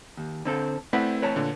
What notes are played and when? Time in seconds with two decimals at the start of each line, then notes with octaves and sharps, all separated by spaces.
0.17 D#2
0.45 D3 C4 A4
0.93 A3 C4 E4 B4 D5 F#5
1.22 B4 C#5 A5
1.36 A#2 D3